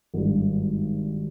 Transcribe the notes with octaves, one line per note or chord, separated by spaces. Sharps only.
G#1 G2 D#3 G3